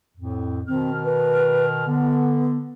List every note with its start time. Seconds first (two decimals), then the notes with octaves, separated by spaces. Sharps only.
0.17 F2 A2
0.68 B2 D#3 C4 F6
1.05 B4
1.86 D3 B3